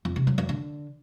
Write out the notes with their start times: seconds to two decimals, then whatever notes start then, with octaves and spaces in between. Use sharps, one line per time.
0.05 F2
0.16 C3
0.27 F#3
0.38 F#2
0.49 D3